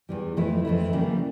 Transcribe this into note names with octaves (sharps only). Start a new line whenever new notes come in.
E2 E3 G3
F2 E3 A3 E4
F2 E3 A3 E4
C#3 E3 G3 A#3